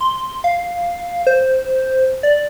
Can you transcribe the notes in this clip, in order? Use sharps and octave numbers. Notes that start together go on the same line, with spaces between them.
C6
F5
C5
D5